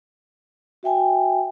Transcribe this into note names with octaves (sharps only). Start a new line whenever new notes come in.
F#4 E5 G5 G#5